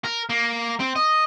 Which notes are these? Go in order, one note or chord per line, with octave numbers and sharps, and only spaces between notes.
A#4
A#3
C4
D#5